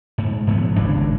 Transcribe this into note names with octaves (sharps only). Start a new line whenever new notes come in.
G#2
G#2 F3 B3
G#1 C#2 A2 D4